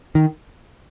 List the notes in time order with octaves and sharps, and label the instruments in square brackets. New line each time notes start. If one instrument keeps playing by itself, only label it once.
[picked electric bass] D#3